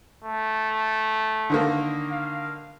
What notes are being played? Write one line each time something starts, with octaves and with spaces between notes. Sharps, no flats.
A3
D3 D#3 A#3
F5